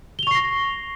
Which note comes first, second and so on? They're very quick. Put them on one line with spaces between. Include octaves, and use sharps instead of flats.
G7 F7 C#6 C7 A#6